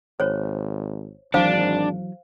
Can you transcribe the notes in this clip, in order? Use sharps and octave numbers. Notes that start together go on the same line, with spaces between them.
G#1 C5 C#5
G#1 E3 F#3 D4 C5 F5